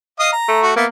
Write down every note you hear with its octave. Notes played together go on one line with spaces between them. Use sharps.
D#5 F5 D#6
A#5
A3
F#4
A#3 B3 E5